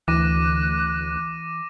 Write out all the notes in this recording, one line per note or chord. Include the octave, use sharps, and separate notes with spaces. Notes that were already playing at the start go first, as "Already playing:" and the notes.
D2 E3 D6 F#6 A#6 D#7